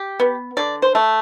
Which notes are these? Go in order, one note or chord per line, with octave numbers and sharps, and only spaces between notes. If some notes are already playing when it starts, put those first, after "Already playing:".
Already playing: G4
B3
D3 D5
C5
A3